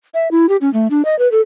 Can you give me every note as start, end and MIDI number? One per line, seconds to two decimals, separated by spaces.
0.14 0.30 76
0.31 0.49 64
0.49 0.57 67
0.61 0.72 61
0.73 0.88 57
0.90 1.05 62
1.05 1.17 75
1.19 1.30 71
1.32 1.41 69